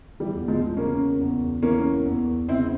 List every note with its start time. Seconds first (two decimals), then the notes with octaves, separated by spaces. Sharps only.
0.20 E3 G3
0.34 E2
0.48 F3 G#3
0.77 C#3 A#3 C#4
1.20 E2
1.62 E3 A#3 C#4
2.05 E2
2.48 C#3 C4 E4